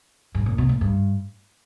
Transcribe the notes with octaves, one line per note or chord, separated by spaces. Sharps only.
G2
A#2
B2
A#2
G2